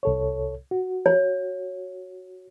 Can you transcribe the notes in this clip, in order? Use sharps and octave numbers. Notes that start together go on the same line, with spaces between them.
C2 A4 C#5
F#4
C#5